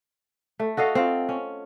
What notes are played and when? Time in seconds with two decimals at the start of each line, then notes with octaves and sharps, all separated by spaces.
0.59 A3
0.77 F#4 A4 D#5 F5
0.95 C4 F4
1.29 C#4